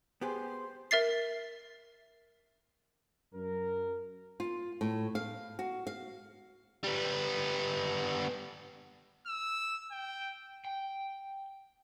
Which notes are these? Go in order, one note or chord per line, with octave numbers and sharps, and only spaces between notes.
B3 G4 G#4 C5
A#4 E5 A6 C7
F#2 A#4
F4
A2
F5
F#4
F5
G3 B3
E6
G5
G5